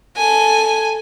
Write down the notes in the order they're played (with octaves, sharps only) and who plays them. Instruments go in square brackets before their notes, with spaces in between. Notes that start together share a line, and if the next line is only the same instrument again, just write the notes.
[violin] A4 G#5